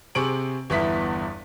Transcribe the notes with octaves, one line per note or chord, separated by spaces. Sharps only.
C3 C4 G#4 C#6 D7 F#7
G1 E2 B3 E4 B6